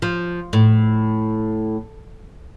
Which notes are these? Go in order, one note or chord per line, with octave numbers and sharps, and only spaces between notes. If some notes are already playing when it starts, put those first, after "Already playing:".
F3
A2